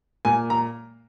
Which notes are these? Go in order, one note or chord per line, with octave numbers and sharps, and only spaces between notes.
A#2 G#5
A#5